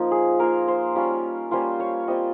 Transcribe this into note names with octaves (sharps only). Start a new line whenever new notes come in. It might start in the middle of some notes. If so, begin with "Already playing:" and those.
Already playing: F3 A#3 D#4 F4
G#4
A#3 F4 A#4
C5
G3 C#4 F4
G3 A#3 C#4 F4 C5
C#5
G3 C4 F4 D#5